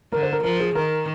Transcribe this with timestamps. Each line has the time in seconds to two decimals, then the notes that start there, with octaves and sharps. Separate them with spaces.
0.12 D3 A#4
0.23 C5
0.32 A#4
0.44 F3 A#4
0.60 G#4
0.75 D#3 A#4